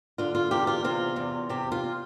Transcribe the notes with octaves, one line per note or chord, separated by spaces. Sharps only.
D3 F4
F4
E2 G4
F4
C3 F4
E2
C3 G4
F4